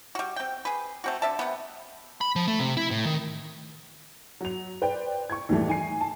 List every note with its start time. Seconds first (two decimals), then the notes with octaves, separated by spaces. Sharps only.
0.15 G3 F#4
0.36 C4 G5
0.65 G#4 B4
1.04 A3 C4 F#4
1.22 D3 E5 A5
1.39 C3 B3
2.21 B5
2.36 F3
2.48 A3
2.59 C3
2.77 E4
2.91 A2
3.05 D#3
4.41 F#3 F7
4.82 B4 C5 D5 G5
5.30 C#6 G#6
5.49 D#2 A2 E3 G3 A3
5.68 D#4 G#5 C7
6.01 A5